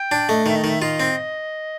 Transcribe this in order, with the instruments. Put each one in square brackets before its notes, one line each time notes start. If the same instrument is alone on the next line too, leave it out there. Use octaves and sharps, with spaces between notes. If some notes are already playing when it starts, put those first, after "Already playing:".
Already playing: [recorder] G5
[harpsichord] D4
[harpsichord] A3 [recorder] D#5
[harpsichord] D#3 [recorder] E5
[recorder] D#5
[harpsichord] D#3 [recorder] E5
[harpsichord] F4 [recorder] D#5
[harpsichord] C4